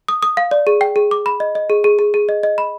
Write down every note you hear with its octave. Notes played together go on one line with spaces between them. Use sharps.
D#6
D#6
F5
D5
G#4
G5
G#4
D6
B5
D#5
D#5
G#4
G#4
G#4
G#4
D#5
D#5
B5